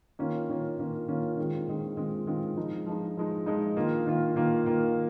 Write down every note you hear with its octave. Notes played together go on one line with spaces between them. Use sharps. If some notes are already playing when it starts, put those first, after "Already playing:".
D#3 A#3 C#4 F4
D#3 A#3 C#4 F4
D#3 A#3 C#4 F4
D#3 A#3 C#4 F4
D#3 G#3 C4 F4
D#3 G#3 C4 F4
D#3 G#3 C4 F4
D#3 G#3 C4 F4
F3 G#3 D#4
F3 G#3 D#4
F3 G#3 D#4
F3 G#3 D#4
D#3 A#3 F4
D#3 A#3 F4
D#3 A#3 F4
D#3 A#3 F4